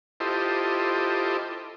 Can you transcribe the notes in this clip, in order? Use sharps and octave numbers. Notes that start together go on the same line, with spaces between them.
E4 F4 G4 A4 C5 D#5